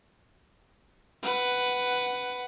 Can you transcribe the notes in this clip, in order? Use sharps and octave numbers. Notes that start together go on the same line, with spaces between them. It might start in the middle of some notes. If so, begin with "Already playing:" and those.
B4 F#5